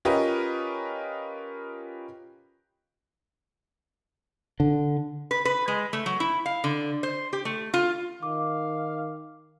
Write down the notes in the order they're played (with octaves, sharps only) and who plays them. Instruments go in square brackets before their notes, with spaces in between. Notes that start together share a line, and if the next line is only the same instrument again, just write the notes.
[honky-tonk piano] C#4 F4 G4 A#4 B4 D#5
[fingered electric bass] D3
[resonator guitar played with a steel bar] B4
B4
G#3
A3
F#3
E4
F5
D3
C5
G4
A3
F4
[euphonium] D#3 [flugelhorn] F5 [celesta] D6